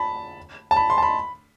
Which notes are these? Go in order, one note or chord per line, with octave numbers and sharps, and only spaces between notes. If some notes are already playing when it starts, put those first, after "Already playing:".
Already playing: A5 B5
A5
B5
C6
A5
B5